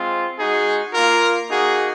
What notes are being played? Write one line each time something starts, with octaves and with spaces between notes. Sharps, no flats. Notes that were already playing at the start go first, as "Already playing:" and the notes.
Already playing: G#3 C4 F4
G#3 D#4 F#4 G#4
A#3 F4 A#4
A#3 D#4 F#4 G#4